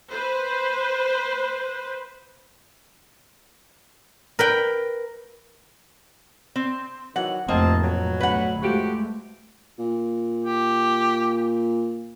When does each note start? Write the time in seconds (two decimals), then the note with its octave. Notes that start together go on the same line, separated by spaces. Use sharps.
0.11 B4 C5
4.39 A#4 B4 G5
6.56 C4
7.16 D#3 E3 F#3 F#5
7.48 F1 A2 A#3 C4 D#5 A5
7.82 B2 F#3
8.20 D2 B4 F#5
8.62 F3 G#3 A3 F#4 G4
9.79 A#2
10.46 G4